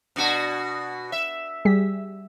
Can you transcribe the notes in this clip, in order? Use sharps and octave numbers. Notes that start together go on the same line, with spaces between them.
B2 D4 F#4
E5
G3 G#4 B6